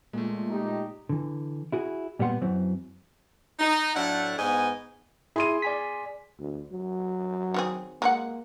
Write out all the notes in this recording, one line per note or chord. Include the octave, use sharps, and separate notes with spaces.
A#2 G#3 A3
D#4 G4
D3 E3
E4 F#4 G#4
A#2 G3 A#3 B3 F#5 C6
F#2 E3 F#3 C4
D#4
A2 F#3 A3 D4 F#5
G#2 B3 D#5 G#5
E4 G#4 C6 D#7
D5 G#5 B6
D2
F#3
D#3 C4 G#4
G#3 A#3 A#4 F#5